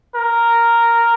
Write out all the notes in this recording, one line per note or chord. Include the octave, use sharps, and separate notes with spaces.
A#4